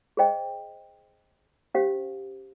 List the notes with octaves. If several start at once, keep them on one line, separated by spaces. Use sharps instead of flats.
G#4 C5 D#5 G5
C#4 G4 C5 F5